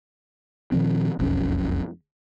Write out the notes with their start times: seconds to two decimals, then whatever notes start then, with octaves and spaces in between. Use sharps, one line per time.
0.72 A#2 D#3 F3 C4
1.19 E1 B1 F2 C#4